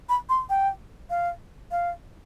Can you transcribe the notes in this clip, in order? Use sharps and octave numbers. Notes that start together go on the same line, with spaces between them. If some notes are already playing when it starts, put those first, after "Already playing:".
B5
C6
G5
F5
F5